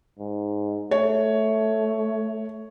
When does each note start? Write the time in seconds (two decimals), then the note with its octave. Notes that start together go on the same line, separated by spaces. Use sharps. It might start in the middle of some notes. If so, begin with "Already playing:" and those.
0.19 G#2
0.91 A3 C#5